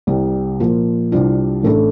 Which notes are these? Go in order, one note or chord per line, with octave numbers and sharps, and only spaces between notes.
C2 C3 G3
A#2 F3 A#3
C2 C3 G3 D4 F4
A1 A2 A3 D4 A4